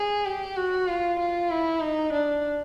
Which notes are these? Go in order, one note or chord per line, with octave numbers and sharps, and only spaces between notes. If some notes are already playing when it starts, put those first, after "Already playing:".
Already playing: G#4
G4
F#4
F4
F4
E4
D#4
D4